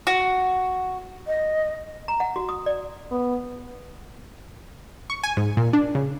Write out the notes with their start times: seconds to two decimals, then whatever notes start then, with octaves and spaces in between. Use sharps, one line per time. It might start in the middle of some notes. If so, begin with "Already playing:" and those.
0.07 F#4
1.27 D#5
2.08 A#5
2.20 F#5
2.36 F#4
2.49 D#6
2.66 D5
3.11 B3
5.10 C#6
5.23 G#5
5.37 G#2
5.57 A#2
5.73 D4
5.95 C#3